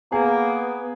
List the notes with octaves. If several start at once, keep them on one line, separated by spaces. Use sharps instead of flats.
A#3 B3 G#4